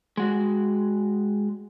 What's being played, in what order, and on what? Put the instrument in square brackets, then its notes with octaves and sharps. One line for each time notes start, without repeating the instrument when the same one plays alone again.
[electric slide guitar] G#3 F#4